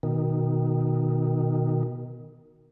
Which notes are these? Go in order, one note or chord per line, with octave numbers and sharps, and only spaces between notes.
B2 D#3